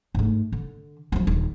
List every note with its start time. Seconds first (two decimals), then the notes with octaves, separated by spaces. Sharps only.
0.15 G#2 A3
0.52 D3
1.12 F3 F#3
1.27 D#1